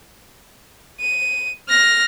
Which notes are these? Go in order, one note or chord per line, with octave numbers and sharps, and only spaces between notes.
D#7
F6 A#6